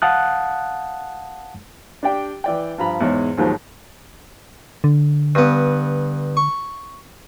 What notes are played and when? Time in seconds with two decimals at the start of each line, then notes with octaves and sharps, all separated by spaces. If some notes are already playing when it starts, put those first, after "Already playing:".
0.02 F5 F#5 A5 D#6 F#6
2.03 D4 G4 D5 G5
2.44 E3 D5 G5
2.78 G2 F3 A#5 B5
3.00 E2 G#2 G#3 C#5
3.37 D#2 G#2 D#3 F3 F#3
4.84 D3
5.35 G2 B3
6.37 C#6